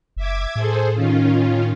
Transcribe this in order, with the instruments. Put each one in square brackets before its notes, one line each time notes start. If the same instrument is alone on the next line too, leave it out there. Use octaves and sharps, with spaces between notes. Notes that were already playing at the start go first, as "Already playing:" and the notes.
[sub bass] F#1 [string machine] E5 D6 G#6
[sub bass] A2 [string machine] G#4 A4 C5
[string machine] D#3 C#4 F4